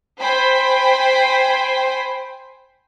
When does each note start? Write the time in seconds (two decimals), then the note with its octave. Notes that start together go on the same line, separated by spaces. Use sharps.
0.19 C5 G5 G#5 B5